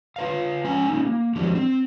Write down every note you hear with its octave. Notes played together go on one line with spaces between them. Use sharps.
F4 B4 F5
G#3 C#4 G#5 A#5
A#3 C#4 D#4
A#3
F3 G#3 D4 F#4 G4
C4